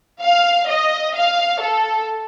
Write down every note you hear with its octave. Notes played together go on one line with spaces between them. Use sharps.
F5
D#5
F5
A4